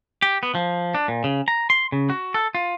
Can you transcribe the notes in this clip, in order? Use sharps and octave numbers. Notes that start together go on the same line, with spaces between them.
G4
B3
F3
D4
A#2
C#3
A#5
C6
C#3
F#4
A4
F4